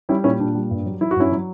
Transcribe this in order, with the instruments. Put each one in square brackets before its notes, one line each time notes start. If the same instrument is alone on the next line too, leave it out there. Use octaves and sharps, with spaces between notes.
[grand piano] G3 C#4 E4
A#2 C#4 E4
A#2 D4
G3
G2
F#3
F#3 E4
F#4
G2 C#4 E4
F#3